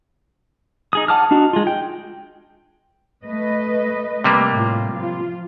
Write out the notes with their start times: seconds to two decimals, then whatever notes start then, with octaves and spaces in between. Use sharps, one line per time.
0.93 D#4 G#4 D#6
1.08 F#5 A5 D6 D#6 F6
1.31 D4 D#4 F#4
1.53 G#3 F4
1.67 G5
3.24 A3 B4 D#5
4.24 C3 G3 A#3
4.54 A2 F4
4.91 F3 F4